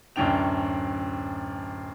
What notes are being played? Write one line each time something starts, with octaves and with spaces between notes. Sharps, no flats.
D1 F#2 C#4 D4 G5 F7